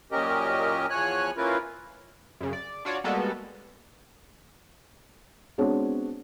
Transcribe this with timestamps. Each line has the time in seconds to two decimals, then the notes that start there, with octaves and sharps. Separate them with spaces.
0.12 F#2 A#2 C#4 G4 A#4 D#5
0.90 E2 F3 C#5 G#5 F#6
1.37 A#3 C#4 E4 F4 A#4 B4
2.41 F#2 C#3
2.53 D5
2.85 D4 F4 F#4 C#5 D5
3.04 G3 G#3 A#3 B3 F#4 A4
5.58 G#3 B3 C4 D4 F#4 C#5